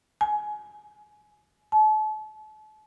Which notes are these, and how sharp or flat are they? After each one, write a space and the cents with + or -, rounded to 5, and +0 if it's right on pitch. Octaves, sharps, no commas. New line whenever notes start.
G#5 +20
A5 -35